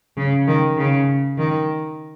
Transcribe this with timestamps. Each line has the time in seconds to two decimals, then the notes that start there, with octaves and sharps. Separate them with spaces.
0.17 C#3
0.47 D#3
0.77 C#3
1.38 D#3